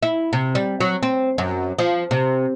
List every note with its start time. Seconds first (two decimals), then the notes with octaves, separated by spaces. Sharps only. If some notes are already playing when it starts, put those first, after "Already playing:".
0.03 E4
0.33 C3
0.55 G3
0.81 F#3
1.03 C4
1.38 F#2
1.79 F3
2.11 C3